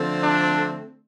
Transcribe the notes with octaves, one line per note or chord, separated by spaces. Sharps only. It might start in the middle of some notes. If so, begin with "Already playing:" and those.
Already playing: D3 F3 A3 C4
D4